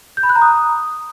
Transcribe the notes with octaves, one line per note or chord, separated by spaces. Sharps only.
G6
B5
F#6
A#5
D#6